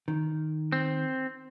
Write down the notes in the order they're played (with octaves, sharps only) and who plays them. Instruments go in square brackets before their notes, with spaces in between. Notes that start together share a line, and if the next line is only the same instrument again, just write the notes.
[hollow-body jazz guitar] D#3
[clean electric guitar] C4